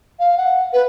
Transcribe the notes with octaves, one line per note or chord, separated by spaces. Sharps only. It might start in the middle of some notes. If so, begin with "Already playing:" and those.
F5
F#5
B4